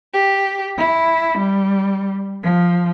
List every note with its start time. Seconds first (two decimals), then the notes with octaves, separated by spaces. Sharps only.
0.14 G4
0.77 E4
1.38 G3
2.43 F3